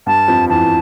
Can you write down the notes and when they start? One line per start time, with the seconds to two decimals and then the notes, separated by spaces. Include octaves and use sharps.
0.07 G2 G3 A5
0.28 F2 F3
0.50 E2 E3 A5